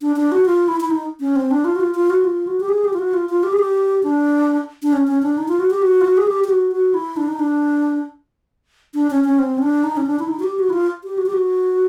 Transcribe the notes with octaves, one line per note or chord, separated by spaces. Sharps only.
D4
D4
F#4
F4
E4
E4
D#4
C#4
C4
D4
F4
F#4
F4
F4
F#4
F4
F#4
G4
G#4
G4
F4
F#4
F4
F4
G4
G#4
G4
D4
D4
C#4
C#4
D4
D#4
F4
F#4
G4
F#4
F4
F#4
G#4
G4
G4
F#4
F#4
E4
D4
D#4
D4
D4
C#4
C#4
C4
C#4
D4
D#4
C#4
D4
E4
D#4
F#4
G4
F#4
E4
F4
G4
F#4
G4
F#4